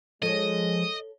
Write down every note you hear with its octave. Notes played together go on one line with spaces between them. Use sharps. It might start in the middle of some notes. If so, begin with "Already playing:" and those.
F3 G#3 A4 C#5 D#5